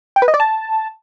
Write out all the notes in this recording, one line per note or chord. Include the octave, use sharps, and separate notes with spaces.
G5
B4
D#5
D5
A5